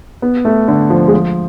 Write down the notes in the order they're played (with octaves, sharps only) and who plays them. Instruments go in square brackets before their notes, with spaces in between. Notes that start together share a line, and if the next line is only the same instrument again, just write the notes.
[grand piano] B3
A3
D3
F3
G#3
F3